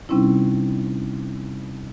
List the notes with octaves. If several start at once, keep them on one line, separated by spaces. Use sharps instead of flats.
C3 G3 C4 C#4 D#4 E4